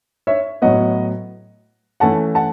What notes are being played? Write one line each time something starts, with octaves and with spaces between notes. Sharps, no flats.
C#5 E5
A2 F#3 B3 D#5 F#5
E3 A3 C#4 F#5 A5
F#5 A5